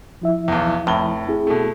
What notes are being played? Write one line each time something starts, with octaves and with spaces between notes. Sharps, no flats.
F3 E4 E5
B1 E2
F1 A2 G7
C4 E4 G#4
B2 A3